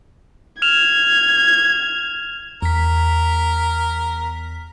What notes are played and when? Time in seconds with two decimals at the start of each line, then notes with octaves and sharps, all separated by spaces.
0.62 F6 G#6 E7 F7
2.62 E2 A#4 B6